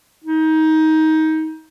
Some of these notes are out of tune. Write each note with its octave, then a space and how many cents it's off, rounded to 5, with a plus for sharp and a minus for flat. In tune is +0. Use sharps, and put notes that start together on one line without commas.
D#4 +20